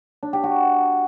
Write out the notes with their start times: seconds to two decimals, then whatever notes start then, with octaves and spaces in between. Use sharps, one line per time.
0.23 D4
0.33 G4
0.44 F#4